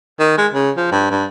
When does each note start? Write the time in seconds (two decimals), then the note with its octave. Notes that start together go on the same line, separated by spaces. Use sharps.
0.20 D#3
0.37 G#3
0.53 C#3
0.77 F3
0.92 G2
1.11 G2